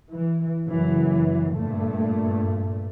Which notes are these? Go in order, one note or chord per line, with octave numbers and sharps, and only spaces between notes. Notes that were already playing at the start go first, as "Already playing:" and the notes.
E3
F#1 E3 F#3
G2 A#2 A3